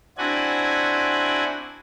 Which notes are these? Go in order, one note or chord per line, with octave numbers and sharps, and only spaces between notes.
C4 D4 E4 F#4 F#5 G#5